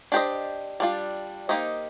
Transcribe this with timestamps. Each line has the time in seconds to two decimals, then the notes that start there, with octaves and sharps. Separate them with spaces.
0.12 D4 G4 C5 D#5
0.80 G3 D4 F4
1.49 A#3 D#4 G4 C5 D#5